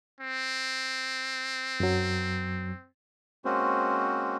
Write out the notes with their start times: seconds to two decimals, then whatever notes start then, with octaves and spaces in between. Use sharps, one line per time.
0.21 C4
1.80 F#2 F#3
3.45 G#3 A#3 C4 C#4 F#4 C5